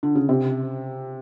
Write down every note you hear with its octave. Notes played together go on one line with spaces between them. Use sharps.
D3
C#3
C3